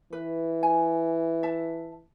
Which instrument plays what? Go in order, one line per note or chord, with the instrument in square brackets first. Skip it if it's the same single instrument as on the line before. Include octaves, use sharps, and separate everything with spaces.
[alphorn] E3 [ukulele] B4
[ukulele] G#5
E5 A5